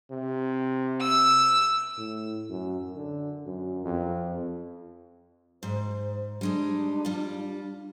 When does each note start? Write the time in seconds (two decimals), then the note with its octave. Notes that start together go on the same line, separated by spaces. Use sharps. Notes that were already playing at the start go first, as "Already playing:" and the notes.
0.11 C3
1.01 E6
1.98 A2
2.49 F#2
2.95 D3
3.46 F#2
3.85 F2
5.63 G#2 C5
6.41 G3 G#3 D4 D#4
7.05 G3 F4